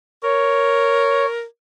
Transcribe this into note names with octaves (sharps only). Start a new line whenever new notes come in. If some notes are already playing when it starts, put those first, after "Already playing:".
A#4 C#5